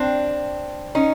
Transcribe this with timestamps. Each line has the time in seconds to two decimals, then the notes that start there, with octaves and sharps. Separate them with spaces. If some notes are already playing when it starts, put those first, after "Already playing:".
Already playing: C4 D4
0.95 C#4 D#4